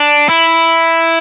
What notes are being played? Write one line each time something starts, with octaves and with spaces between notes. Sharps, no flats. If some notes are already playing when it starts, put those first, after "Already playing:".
Already playing: D4
E4